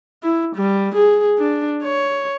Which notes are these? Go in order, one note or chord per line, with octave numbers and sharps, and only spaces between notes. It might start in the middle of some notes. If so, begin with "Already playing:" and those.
E4
G3
G#4
D4
C#5